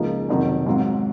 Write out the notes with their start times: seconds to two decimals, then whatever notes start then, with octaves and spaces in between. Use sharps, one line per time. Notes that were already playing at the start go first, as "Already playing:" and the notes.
Already playing: C#2 C#3 F3 A#3 D#4
0.29 F2 C3 D#3 F#3
0.66 G#2 F#3 C4 F4